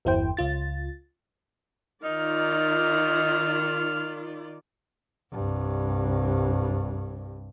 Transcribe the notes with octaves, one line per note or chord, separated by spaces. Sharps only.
G1 E2 E4 C5 G5
C#2 F4 A6
D#3 D#4 F4 D5 F6
C2 G2